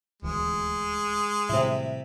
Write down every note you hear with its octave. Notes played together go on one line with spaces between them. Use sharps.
D#1 D2 E3 G#3
A2 C3 D#3 G3 E4